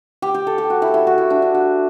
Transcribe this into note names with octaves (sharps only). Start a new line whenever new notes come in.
G4
G4
A4
G4
F#4
E4
E4
F#4
E4
D4
E4
F#4